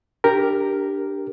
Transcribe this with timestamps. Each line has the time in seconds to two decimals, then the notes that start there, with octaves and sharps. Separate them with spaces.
0.24 D4 G4 A#4